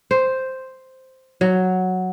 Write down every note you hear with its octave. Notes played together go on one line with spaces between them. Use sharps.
C5
F#3